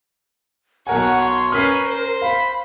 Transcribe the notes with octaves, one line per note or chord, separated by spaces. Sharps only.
B1 A#4 C#5 F#5 G#5
C6
C#4 A#4 B4 F6 B6 C7
C5
F5 B5